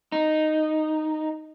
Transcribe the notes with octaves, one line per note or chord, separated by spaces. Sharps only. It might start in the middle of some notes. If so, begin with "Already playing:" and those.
D#4